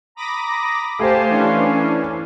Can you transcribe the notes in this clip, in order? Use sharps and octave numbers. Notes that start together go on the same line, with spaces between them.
A#5 B5 D6 D#6 A#6
A3 G4 C5 F5 G#5 A5 C6
E3 C#4 D4